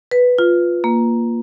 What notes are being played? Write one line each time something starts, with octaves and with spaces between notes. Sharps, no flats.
B4
F4
A#3